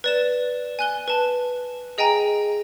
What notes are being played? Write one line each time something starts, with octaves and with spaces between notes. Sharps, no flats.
B4 D5 E7
G#5 F#6 G7
B4 A5
G#4 D#5 G5 G#5 A#5